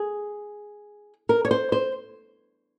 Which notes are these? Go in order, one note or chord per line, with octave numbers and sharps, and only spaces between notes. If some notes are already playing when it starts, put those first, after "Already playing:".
Already playing: G#4
A#4
C#5
C5
C5